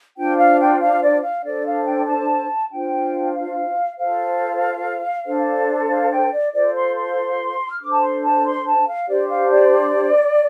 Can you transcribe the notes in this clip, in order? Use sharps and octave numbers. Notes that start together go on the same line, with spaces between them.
D4 F4 C5 G5
F5
G5
F5
D5
F5
D4 A4 C5 D5
F5
G5
A5
D4 F4 C5 G5
F5
F4 A4 C5 F5
D4 A4 C5
F5
G5
D5
F4 A4 C5 D5
C6
C6
F6
D4 A4 C5 D6
A5
C6
A5
C6
A5
F5
D4 G4 C5 D5
F5
D5